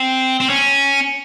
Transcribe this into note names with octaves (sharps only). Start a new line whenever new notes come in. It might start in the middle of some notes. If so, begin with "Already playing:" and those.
Already playing: C4
C4
C#4